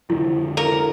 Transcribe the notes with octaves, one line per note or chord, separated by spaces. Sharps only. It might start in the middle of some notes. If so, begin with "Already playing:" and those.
F2 D3 F3 E4
A4 A#4